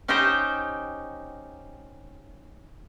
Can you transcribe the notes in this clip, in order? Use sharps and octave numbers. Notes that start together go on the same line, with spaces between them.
C#4 D#4 G4 C5 D#5 G5